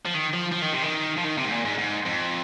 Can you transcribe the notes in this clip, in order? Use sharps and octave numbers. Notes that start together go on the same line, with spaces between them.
F3
D#3
F3
F3
D#3
C3
D#3
F3
D#3
C3
G#2
A#2
G#2
G#2
F2